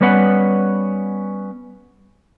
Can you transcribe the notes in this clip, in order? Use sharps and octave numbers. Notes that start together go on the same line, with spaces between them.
G3 B3 C#4 B4 F#5